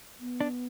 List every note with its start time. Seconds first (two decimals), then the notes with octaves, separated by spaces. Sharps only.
0.20 B3
0.41 D4